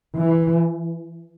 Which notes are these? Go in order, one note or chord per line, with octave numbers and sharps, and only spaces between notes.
E3